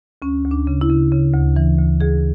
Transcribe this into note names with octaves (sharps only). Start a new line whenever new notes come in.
D2 C#4
D2
D4
C#3
E4
C#3
C#3
D2
E3
D2
D2 G#4